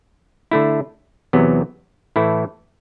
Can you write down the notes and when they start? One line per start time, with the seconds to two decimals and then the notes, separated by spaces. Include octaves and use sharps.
0.51 D3 A3 E4
1.33 E2 C3 F#3 B3
2.16 A2 E3 A3 E4